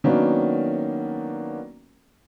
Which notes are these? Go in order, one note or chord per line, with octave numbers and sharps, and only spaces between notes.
D#3 F#3 A#3 B3 C#4 D4